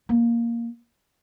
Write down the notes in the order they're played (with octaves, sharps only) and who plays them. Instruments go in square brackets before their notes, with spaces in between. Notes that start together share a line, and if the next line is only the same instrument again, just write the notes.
[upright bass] A#3